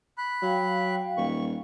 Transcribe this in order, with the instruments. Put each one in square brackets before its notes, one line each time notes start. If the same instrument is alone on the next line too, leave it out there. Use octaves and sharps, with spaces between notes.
[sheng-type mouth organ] B5 F#6
[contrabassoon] F#3 [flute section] F5 G5
[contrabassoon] D#1 [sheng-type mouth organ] C#6